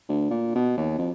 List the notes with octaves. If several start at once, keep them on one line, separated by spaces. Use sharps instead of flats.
D2
A#2
B2
D#2
F2